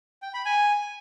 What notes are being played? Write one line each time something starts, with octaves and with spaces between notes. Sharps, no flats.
G5
B5
G#5